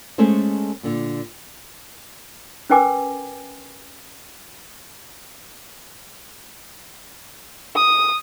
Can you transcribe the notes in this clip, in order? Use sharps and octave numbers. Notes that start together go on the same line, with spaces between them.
G#3 A3 C#4 G#4 A4 C5
A#2 D3
C#4 A#4 B4 G5 G#5 D6
D#6